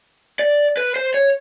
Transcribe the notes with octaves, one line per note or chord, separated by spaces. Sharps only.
D5
B4
C5
C#5